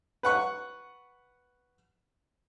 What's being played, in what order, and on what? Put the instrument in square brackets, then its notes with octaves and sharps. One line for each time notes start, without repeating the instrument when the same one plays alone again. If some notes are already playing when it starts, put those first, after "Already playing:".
[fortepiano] B4 F#5 C#6